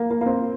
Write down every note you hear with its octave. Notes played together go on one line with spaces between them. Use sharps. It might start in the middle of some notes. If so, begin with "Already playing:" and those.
Already playing: A#3
A#3
A#3
C4